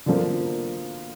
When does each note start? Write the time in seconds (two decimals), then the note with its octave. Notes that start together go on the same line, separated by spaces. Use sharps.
0.06 D3 F3 A#3